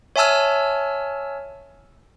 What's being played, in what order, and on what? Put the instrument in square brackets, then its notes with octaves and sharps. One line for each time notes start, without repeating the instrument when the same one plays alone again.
[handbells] C#5 E5 G#5 A5 E6 F6